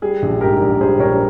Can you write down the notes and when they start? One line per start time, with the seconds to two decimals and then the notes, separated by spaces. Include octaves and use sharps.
0.02 G3 G#4
0.22 A#1
0.41 G#2 G4 A#4
0.61 A#1
0.80 G3 G#4 C5
1.00 A#1 A#4 C#5